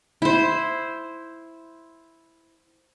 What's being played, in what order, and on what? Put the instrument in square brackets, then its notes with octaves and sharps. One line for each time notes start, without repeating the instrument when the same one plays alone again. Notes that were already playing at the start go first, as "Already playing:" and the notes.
[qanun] E4 C5